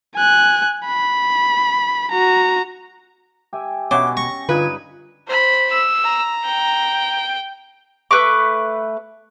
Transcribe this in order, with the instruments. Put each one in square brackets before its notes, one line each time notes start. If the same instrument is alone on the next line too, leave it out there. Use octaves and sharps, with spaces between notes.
[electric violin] G#5 F#6
B5
F#4 A#5
[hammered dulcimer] G4 E5 G#5
[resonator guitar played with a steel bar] B2 [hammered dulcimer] C#4 [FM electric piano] C#5 E5 F#5 [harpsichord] D6
[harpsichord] C#6 [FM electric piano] A#6
[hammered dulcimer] G2 D#4 F5 [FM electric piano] D3 F4 G#6 [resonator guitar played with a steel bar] B4
[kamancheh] C5 B5
[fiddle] E6
[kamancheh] A#5
[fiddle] G5
[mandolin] A3 B4 C#6 D6